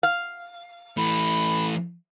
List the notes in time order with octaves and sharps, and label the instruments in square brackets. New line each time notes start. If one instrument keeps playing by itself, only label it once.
[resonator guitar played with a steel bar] F5
[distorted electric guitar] E3 A3 [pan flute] B5